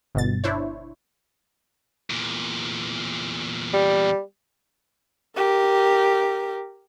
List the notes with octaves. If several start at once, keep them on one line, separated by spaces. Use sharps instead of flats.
G1 B2 A6
D4 E4 C5 C#5
E2 A#2
G3
G4 A#4